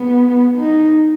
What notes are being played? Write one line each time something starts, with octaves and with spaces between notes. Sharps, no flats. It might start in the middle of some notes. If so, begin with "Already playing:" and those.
Already playing: B3
D#4